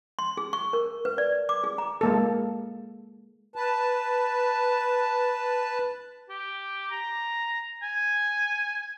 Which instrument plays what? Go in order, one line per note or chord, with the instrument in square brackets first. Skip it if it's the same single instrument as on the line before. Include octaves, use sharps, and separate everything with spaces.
[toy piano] C6
G#4
C#6
A#4
B4
D5
D6
G#4
A#5
[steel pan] G#3 A#3 A4
[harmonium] B4 A5
[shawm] G4
A#5
G#5